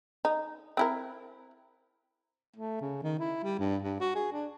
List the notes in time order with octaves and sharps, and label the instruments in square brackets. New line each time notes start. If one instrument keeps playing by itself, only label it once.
[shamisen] D#4
C4 E4 A#4
[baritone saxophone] A3
C#3
D#3
E4
G3
G2
G2
F#4
G#4
D4